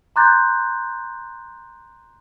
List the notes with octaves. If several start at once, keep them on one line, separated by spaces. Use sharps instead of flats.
A#5 C6 D6 F#6 G6 A6